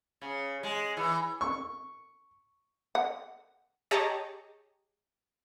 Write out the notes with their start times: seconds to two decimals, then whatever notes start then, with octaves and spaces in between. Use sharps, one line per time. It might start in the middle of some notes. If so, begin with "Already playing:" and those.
0.21 C#3
0.63 G#3
0.97 E3
1.41 C#6
2.95 F#5
3.91 G4 G#4 C#5 D#5 A5 A#5